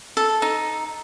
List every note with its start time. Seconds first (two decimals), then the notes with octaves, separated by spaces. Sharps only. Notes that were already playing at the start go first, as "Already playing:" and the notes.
0.17 A4
0.42 D#4